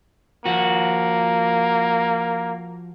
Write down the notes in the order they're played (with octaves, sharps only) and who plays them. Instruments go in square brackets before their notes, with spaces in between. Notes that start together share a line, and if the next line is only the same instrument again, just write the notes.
[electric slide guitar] F3 F#4 [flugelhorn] A#3